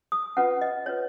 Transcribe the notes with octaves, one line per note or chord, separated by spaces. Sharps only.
D#6
C#4 F4 B4 F#5
D#5
C#4 F4 B4 C#5